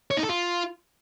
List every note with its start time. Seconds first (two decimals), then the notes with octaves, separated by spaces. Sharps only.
0.11 C#5
0.17 D#4
0.23 A4
0.29 F4